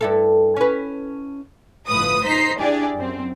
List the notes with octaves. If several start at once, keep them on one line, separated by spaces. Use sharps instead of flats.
G2 E4 A4
C#4 B4
G1 A2 F3 B4 D#6
D#4 C5 A#5 B6 C7
D4 E4 G4 G#4 D5
F#2 C4